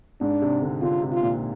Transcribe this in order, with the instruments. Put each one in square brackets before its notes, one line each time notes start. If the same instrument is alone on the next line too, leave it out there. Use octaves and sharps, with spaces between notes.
[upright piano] G#2 [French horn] D4
[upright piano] C3
D3
[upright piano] D3 [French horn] F4
[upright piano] C3
[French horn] F4
[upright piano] A#2